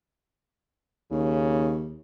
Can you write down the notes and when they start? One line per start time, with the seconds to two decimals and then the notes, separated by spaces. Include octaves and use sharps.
1.11 D#2 C#3